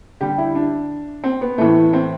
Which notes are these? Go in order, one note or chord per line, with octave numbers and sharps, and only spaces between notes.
D3 G3 G4
E4
D4
C4
B3
A2 E3 A3
C4